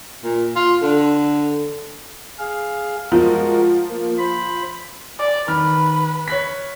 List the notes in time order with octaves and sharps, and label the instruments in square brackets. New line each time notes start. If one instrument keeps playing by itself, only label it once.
[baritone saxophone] A#2
F4
D3
[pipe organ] G#4 F5
[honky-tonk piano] F3 [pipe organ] G#3 F#4 A#4
[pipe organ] A#3
C5 B5
[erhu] D5
[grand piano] D#3 F6 [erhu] B4
[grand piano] C#5 F#6 B6